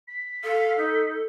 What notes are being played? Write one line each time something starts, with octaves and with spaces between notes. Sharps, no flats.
B6
A4 F5
D#4